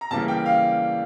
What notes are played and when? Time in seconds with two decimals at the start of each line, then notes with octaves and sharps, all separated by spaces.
0.01 A#5
0.11 C#3 E3 G3 A#3 A5
0.28 G5
0.46 F5